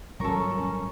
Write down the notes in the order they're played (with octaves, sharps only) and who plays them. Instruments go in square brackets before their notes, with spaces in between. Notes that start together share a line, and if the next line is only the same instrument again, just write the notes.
[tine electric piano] G#1 C#6 [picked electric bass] A#2 F#3 G3 [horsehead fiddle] C#4 [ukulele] A4 A#4